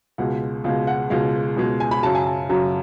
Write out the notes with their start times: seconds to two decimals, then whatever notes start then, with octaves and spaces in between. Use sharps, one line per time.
0.18 C#2 B2 G#3 F#5
0.64 C#2 B2 G#3 F5
0.87 F#5
1.10 C#2 B2 G#3 F5
1.56 C#2 B2 G#3
1.80 G#5
1.91 B5
2.03 F#2 C#3 F#3 A5
2.15 G#5
2.26 A5
2.49 F#2 C#3 F#3